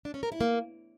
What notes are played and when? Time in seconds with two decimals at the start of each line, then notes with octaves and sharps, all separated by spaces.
0.05 D4
0.14 C#4
0.23 A#4
0.32 E4
0.41 A#3